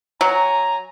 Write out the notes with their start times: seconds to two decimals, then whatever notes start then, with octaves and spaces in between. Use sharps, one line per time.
0.21 F#3 G#5 A#5